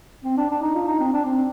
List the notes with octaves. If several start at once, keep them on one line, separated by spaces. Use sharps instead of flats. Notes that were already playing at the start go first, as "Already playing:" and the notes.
C4
D4
D4
D#4
F4
D#4
C4
D4
C4